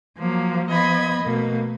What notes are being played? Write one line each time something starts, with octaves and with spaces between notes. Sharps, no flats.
F3 F#3 A#3
F3 B3 D#5 B5 G#6
B2 A3 A#3